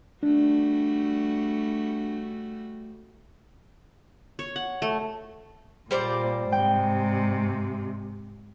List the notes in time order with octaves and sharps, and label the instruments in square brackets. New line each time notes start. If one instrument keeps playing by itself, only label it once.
[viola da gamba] G3 A3 F#4 [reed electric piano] D4
[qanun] C#5
F#5
A3
[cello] A#2 [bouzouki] G3 C5 D5
[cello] G#2 C3 [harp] G5